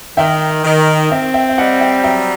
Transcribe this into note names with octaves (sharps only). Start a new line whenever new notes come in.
D#3 E5 G5
D#3
C4 E5 G5
E5 G5
E5
G3 D#5 F#5
E5 G5
F#3 E5 G5